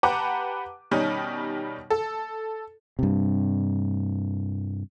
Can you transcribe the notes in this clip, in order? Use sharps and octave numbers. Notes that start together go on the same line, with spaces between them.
G4 B4 F#5 A5 A#5 D6
B2 D#3 G3 C#4 D#4
A4
G2 C3